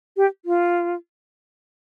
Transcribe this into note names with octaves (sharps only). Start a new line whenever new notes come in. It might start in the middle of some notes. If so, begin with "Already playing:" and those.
G4
F4